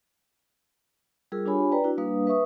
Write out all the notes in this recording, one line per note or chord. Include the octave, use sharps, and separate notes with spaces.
G3 F4 G#4 A#4 E6
D4 F4 G4 C#5 G#5 B5
B4 D5 G5 A#5
D4 E4 F#4
G3 A#3 D4 B4 F5 D#6
B4 E5 C#6 D#6